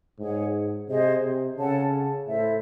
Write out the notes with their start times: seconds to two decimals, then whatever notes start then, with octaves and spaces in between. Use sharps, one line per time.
0.19 G#2 G#4 C#5 F#5
0.89 C3 G#4 C5 D#5
1.23 C3
1.58 C#3 A4 C#5 F#5 A5
2.27 A2 E4 A4 C5 E5